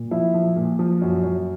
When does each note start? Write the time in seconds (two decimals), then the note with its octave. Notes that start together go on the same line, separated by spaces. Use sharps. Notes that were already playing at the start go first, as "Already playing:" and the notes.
Already playing: A#2
0.11 F3 E4
0.34 F3
0.56 A#2
0.79 F3
1.02 F#2
1.23 F#2